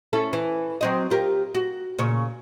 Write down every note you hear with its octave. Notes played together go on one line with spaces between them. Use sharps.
C#4 E4 A4
E3
F#3 C4 D#5
F4 G4 A#4
F#4
A#2 C#3 C#5